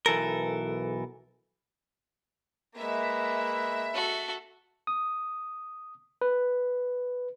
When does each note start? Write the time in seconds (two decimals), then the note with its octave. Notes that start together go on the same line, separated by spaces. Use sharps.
0.06 B1 E3 A4 A#4
2.78 G#3 A#3 B4 E5
3.94 F#4 A4
4.87 D#6
6.21 B4